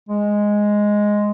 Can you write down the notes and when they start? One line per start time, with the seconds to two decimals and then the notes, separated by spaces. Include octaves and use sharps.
0.09 G#3